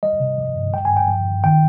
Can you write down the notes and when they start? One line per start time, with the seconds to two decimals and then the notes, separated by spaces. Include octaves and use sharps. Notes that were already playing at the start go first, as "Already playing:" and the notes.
0.03 G3 D#5
0.20 C3
0.38 F3
0.56 G2
0.73 G3 G5
0.85 G#5
0.91 G2
0.97 G5
1.08 F3
1.25 G2
1.44 D#3 G5